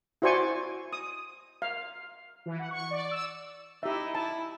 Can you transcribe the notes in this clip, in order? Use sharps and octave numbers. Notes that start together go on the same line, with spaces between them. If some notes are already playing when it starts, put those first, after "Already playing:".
E4 F#4 C5 D5 G#5 C#6
D#6
F5
E3
F#5
C#6
D5
E6
D#4 E4 G4 E5
E4 A5